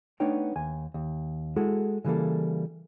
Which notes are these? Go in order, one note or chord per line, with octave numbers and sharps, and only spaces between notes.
A3 B3 D4 D#4 C#5 G5
D#2 G#5
D#2
G#3 E4 F#4 G#4 A4
C#3 E3 G3 A#3 A4